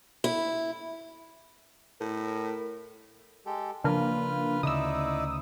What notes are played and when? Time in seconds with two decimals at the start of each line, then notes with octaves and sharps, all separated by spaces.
0.24 E4
2.01 A2 A#4
3.46 G#3 G4 A4
3.84 C#3 F3 A#3 D4 F4 B4 F6
4.63 D2 C#3 D#4 E4 D5 D#6 E6